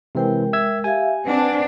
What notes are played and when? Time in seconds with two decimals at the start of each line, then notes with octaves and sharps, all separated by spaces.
0.15 C3 E3 G#3 C4 A#4 G5
0.53 E5 E6 G#6
0.84 G4 E5 F5 G#5 G#6
1.25 C4 D4 B4 F#5 A5